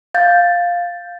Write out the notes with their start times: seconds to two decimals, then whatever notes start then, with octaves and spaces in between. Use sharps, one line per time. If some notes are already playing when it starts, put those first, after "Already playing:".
0.14 F5 G6 A6